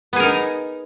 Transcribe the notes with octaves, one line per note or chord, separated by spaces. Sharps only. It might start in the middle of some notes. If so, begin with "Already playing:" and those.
B3 D#4 G#4 A#4